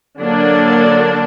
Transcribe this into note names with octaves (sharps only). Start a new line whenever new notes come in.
D3 F#3 A#3 D4